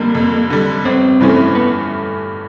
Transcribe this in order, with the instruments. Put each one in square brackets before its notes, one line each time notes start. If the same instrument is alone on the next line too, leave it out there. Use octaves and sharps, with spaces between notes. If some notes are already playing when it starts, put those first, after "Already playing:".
Already playing: [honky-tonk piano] F2 D3 G3 [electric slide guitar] A#3
[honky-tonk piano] F2
D3 G3
[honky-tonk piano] G1 [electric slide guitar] C4
[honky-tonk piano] G2 E3 A3 C#4
[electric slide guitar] B3